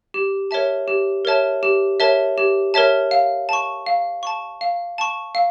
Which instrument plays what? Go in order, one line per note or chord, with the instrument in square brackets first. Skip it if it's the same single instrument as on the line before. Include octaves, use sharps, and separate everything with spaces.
[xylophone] G4
A#4 C#5 E5 A5
G4
A#4 C#5 E5 A5
G4
A#4 C#5 E5 A5
G4
A#4 C#5 E5 A5
F5
A5 C#6
F5
A5 C#6
F5
A5 C#6
F5